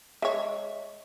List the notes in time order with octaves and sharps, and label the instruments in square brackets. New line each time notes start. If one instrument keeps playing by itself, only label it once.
[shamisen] G#3 C#5 [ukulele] E5